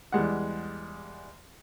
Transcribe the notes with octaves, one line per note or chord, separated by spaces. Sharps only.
E2 G3 G#3 F#5